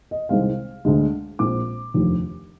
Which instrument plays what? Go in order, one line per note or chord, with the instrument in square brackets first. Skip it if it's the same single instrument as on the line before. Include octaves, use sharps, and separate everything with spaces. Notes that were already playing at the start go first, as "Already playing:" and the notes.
[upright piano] D#5
C2 C3 D#3 G#3 C4 F5
D2 D3 G#3
A#1 A#2 G#3 C4 D6
F1 D#2 D3 F3